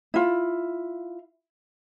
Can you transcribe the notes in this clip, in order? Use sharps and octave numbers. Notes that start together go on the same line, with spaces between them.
E4 F4